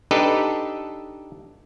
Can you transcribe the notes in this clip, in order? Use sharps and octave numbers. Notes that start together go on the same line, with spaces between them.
D4 D#4 G4 A4 B4 D#5